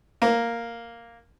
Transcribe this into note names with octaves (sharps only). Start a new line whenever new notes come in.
A#3